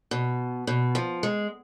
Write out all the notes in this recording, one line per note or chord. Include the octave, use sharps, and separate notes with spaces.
B2
B2
F3
G#3